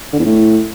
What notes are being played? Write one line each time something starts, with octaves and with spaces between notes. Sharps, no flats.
D3
E2
A2